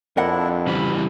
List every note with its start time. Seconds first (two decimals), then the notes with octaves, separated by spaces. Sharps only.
0.17 F2 D4 E4 A#4 D#5 F#5
0.67 C#3 E3 G3 B5